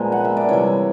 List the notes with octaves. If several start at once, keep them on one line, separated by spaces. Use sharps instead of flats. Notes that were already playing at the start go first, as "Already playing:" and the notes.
Already playing: A#2 F3 G#3 B3
F#5
E5
D5
C3 E3 G3 C#5